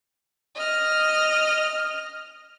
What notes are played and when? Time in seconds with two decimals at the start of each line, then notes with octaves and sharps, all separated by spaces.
0.55 D#5 F6